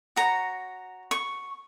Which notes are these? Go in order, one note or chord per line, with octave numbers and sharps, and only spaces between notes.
F#4 C#5 A#5
C#6